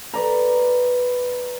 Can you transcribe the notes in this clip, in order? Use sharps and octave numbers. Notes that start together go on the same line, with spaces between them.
B4 D5 A#5